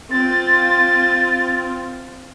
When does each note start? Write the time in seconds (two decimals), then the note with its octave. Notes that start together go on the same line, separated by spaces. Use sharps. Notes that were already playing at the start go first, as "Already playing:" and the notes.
0.11 C4 F4 A6